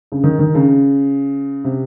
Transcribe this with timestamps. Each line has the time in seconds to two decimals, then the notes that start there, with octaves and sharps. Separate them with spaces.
0.12 C#3
0.24 D#3
0.39 D#3
0.55 C#3
1.64 C3